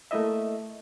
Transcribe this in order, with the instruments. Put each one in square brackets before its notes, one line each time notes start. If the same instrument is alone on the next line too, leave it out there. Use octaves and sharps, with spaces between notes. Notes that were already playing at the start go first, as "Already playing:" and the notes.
[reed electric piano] A3 A#3 E4 D#5 E5